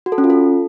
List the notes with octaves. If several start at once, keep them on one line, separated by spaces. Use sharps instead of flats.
F#4
A4
C#4
F4
A4